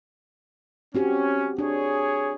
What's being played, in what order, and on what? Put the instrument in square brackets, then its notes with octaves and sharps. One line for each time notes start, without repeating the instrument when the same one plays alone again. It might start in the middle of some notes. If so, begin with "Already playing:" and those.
[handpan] C4 F#4 G4 [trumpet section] C#4
[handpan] D4 [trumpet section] G#4 C#5